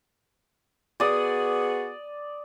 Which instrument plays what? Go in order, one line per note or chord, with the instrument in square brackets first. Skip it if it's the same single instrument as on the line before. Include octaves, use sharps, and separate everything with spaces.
[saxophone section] B3 F#4 G#4 [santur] D5 D#6